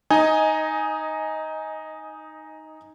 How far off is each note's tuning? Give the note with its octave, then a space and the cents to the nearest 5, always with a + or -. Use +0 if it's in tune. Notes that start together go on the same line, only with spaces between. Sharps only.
D#4 +0 D#5 +15 G#5 +0